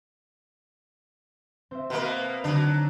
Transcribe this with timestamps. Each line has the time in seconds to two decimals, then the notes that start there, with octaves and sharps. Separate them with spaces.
1.71 C4 C5 E5
1.90 B2 A#3
2.44 D3 F#3 D4 D#4